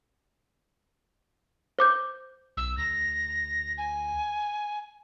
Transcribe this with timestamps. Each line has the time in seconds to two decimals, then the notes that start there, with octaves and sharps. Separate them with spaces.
1.79 C5 D6 G6
2.57 B1 E6
2.77 D2 A#6
3.77 G#5